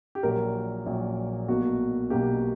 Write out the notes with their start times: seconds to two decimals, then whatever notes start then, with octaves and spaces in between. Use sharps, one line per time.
0.15 G4
0.23 A#1 A#2 F#3 A#4
0.86 A#1 A#2 F#3
1.48 B1 B2 A#3 F#4
2.10 B1 B2 A#3 G4